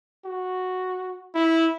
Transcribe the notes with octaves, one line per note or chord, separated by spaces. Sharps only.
F#4
E4